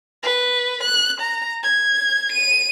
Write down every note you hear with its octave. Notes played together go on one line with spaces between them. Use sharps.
B4
F#6
A#5
G#6
D#7